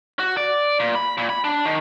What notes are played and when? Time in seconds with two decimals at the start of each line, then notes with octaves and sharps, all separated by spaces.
0.20 F#4
0.37 D5
0.80 A#2
0.95 B5
1.18 A#2
1.30 B5
1.44 D4
1.65 D#3